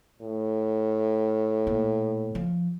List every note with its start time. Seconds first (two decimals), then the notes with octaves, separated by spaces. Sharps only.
0.21 A2
1.67 A#2
2.35 F3